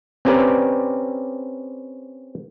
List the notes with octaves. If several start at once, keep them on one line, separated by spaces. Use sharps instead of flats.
C4 C#4 G4 A#4 B4 D5